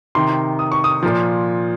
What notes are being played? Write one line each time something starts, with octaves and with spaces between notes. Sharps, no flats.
C3 D#3 C6
D#6
C#6
D#6
A#2 F3